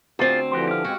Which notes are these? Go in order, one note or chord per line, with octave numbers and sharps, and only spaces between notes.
D2 C4 F4 G#4
D3 E3 F3 F#4 G4 C5
G4 F5
G#3 C4 F#4 G#5